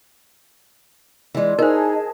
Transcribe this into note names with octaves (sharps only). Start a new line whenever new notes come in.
E3 G#3 D4 F4
D#4 G#4 A#4 C5 D#5 A5